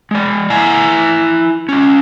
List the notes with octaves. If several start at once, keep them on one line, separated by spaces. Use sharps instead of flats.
G#3 D5
E4 G#5 A#5
C#4 F4